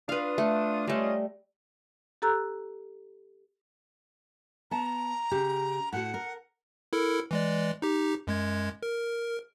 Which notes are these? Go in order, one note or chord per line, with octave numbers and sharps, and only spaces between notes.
D4 F4 B4 F5 D#6
A3
G3 A3 C#4 F4 D#5
G4 A4 A#5 E6 F#6 G6
B3 A5 A#5
C#3 G4
A2 F#4 F#5
A#4
E4 A4 A#4
E3 G#3 D5
D#4 G4
F#2 G#3 G#6
A#4